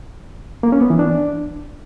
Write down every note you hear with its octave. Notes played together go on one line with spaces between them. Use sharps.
A#3
C#4
B3
E3
D4